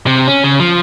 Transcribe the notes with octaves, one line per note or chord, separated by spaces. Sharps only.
C3
C#4
C#3
F3